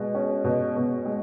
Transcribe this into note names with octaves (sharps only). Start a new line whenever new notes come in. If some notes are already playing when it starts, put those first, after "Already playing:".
Already playing: B2 G#3
C#4
B2
B2
G#3